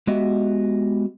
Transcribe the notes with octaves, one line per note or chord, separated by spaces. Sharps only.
G#3 B3 F#4 G4 D#5 E5